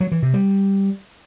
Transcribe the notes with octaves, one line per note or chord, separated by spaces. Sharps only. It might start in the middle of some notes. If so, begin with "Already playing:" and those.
F#3
E3
C3
G3